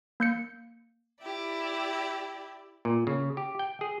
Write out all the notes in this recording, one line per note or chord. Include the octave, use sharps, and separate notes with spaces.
A#3 G6 C#7
E4 G4 D5
A#2
C#3
G4
G5
G#4